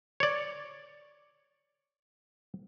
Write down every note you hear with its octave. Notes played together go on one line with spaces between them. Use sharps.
C#5 D5